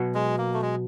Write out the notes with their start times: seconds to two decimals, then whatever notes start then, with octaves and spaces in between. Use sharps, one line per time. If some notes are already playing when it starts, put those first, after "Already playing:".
Already playing: B2 F#3 B3
0.15 G#3
0.38 A#3
0.54 A3
0.62 G#3